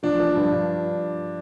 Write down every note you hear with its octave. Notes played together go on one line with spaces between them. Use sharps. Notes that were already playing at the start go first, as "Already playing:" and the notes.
F3 D4
F3
G2
G2